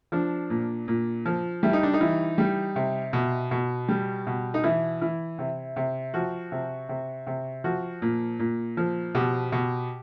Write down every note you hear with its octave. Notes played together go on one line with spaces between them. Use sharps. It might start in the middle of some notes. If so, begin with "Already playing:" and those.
F3 D4
A#2
A#2
F3
G3 E4
D#4
D4
D#4
E3
G3
C3
B2
B2
G3
B2
D#4
E3 E4
E3
C3
C3
F3 F#4
C3
C3
C3
F3 F#4
A#2
A#2
F3
B2 G4
B2